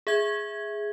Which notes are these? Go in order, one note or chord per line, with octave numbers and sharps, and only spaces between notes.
G#4 E5 G#6